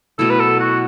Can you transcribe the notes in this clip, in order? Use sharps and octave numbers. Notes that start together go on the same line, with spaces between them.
B2 F#3 A3 E4 A4
B4
A4
F#4